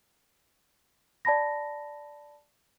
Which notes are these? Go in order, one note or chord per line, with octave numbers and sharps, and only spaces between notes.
D5 A5 B5 A#6